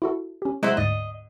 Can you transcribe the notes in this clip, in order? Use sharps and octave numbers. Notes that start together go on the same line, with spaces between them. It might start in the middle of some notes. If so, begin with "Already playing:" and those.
E4 F#4 A4
C#4 G4
F#3 G#3 E4 C5
D2 G#2 D#5 A6